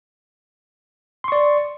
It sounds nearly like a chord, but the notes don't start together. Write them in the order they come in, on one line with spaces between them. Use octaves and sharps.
C6 C#6 D5